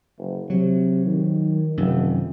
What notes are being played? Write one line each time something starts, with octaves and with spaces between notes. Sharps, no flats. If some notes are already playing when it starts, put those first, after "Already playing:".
F#1
C3 F#3
D#3
F1 F#2 C3 D#3